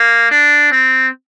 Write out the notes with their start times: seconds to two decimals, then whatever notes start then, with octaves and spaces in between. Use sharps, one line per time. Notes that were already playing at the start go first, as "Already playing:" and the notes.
Already playing: A#3
0.31 D4
0.71 C4